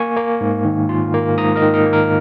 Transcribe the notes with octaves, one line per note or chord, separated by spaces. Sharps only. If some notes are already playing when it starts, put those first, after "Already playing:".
Already playing: A#3 G#5 C#6
A#3
G#2
D#3
F4
A#3
G#2 A#5 D#6
A#4 D#5
D#3
A#4 D#5
A#3
A#4